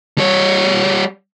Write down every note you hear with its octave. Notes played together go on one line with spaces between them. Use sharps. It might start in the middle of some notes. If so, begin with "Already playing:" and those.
G3 C#5